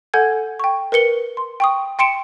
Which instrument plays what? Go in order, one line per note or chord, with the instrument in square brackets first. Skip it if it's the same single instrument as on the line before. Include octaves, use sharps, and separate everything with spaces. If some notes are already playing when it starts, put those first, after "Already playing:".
[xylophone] A4 F#5 G#5 G6 G#6
G5 C#6
A#4 B4 C#7 G7
C6
G5 C#6 D#6
G5 C6 C#7 D7 E7